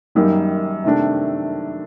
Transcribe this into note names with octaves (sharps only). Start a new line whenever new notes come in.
F#2 D#3 G3 A#3 D#4
C3 D#3 A3 D4